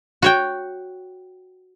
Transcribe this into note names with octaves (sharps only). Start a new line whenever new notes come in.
F#4 C#5 G5